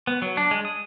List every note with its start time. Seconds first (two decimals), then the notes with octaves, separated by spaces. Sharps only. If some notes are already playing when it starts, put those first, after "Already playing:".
0.07 B3
0.22 F#3
0.37 D4
0.51 G#3
0.65 D#6